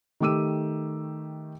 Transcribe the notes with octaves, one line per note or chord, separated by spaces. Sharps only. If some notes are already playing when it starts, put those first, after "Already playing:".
D#3 A3 G4 D6 E6 D#7